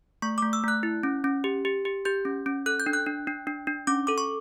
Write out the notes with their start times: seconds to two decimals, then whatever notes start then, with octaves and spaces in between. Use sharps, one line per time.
0.22 A3 C#6
0.38 A3 D6
0.53 E6
0.64 A3 F#6
0.83 E4
1.03 C#4
1.24 C#4
1.44 G4
1.65 G4
1.85 G4
2.05 G4 G6
2.25 C#4
2.46 C#4
2.66 A4 F#6
2.80 G6
2.86 D4
2.93 F#6
3.06 D4
3.27 D4
3.47 D4
3.67 D4
3.87 C#4 D6
4.07 A4 D6
4.18 C#6